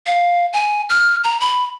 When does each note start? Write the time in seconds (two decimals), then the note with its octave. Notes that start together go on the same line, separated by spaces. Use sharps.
0.07 F5
0.53 G#5
0.89 F6
1.24 A#5
1.41 B5